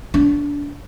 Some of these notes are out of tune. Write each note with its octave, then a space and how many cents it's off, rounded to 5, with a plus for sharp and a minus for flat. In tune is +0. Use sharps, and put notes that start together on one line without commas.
D4 -20